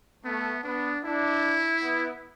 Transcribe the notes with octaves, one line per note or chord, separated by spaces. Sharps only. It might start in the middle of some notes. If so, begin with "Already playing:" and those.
A3 B3
B3 D4
D4 E4
B3